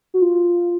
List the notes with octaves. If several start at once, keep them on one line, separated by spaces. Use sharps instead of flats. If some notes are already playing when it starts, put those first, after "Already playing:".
F#4
F4